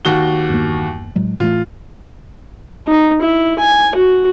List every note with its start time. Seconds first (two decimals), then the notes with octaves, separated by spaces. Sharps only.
0.05 D#2 F#4 G7
0.49 E2 G2 A#3
1.15 A2 F#3 G#3
1.40 A2 E3 A3 F4
2.87 D#4
3.21 E4
3.59 G#5
3.95 F#4